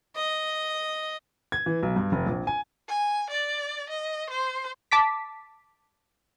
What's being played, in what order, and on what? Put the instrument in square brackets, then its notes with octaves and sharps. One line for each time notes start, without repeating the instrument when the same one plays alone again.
[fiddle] D#5
[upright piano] G#6
E3
B1
G2
F1
A#1
G#5
[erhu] G#5
D5
D#5
C5
[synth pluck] A5 D6 B6